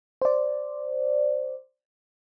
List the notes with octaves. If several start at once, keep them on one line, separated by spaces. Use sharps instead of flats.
C5 D5